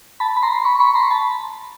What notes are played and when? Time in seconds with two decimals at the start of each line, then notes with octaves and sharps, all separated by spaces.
0.20 A5 B5
0.36 B5
0.43 A#5 C6
0.65 B5 C#6
0.80 B5 C#6
0.95 A#5 C6
1.10 A5 B5